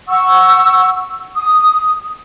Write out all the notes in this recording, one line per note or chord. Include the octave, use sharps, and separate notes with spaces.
F#5 C#6 E6
D#6